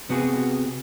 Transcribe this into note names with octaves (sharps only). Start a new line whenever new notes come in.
C3 B3 F#4 G#4